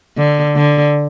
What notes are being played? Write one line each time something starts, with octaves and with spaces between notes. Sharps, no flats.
D3
D3